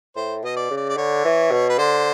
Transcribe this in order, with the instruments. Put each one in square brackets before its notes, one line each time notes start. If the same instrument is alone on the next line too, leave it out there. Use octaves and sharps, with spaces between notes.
[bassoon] A2 [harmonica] C5
[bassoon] B2 [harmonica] D#5
[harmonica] D5
[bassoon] C#3
[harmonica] D5
D5
[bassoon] D3 [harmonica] C#5
[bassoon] E3
B2
[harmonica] B4
[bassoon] D3 [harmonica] C5